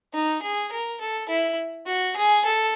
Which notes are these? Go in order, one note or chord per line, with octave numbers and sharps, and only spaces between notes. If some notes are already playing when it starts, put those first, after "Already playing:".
D#4
G#4
A#4
A4
E4
F#4
G#4
A4